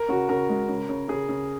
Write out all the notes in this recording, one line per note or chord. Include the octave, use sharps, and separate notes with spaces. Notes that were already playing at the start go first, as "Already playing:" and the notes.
Already playing: A#4
C#3 F#4
C#3 A#4
G#3
C#3
C#3
C#3 G#4
C#3